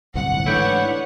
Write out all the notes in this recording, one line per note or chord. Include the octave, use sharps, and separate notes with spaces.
D1 G1 C2 F#5
G#2 E3 A3 D4 E4 B4 C#5 G5